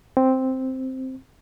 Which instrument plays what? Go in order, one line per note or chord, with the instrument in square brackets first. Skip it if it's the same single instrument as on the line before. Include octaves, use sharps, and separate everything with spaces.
[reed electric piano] C4